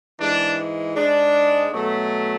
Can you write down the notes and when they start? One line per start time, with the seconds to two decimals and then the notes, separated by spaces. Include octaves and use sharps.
0.19 G#2 E3 G#3 D4
0.96 G#2 G#3 D4
1.73 B2 F#3 A3